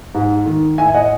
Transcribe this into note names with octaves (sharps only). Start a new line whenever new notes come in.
G#2
D#3
A2 E5 G#5
G#5
D#5 F#5